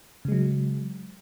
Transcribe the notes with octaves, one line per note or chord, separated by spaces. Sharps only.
C#3 F#3 G#3